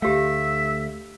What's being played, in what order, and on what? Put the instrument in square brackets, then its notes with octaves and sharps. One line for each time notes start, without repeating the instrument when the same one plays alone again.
[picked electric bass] D2 A3 [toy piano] G4 F5 [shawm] E5